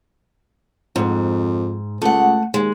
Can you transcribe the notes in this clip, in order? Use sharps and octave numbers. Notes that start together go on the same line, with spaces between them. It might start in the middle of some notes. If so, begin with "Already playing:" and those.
F2 G#2
C#2 A3 F#5
D#2 G#3